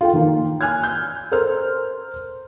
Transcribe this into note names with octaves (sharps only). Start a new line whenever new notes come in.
F4 A4 G5
D#3 A#3
G#5 F6 F#6 G#6
G6
A4 A#4 C5 F6